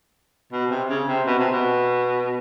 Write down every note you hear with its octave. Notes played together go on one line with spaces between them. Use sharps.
B2
C3
C#3
C3
B2
C3
B2